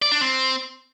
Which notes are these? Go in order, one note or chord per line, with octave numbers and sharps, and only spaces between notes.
D5
D4
C4